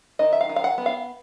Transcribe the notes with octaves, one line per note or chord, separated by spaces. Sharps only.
D#3 D#5
E5
F5
D#3
F5
F#5
B3
F5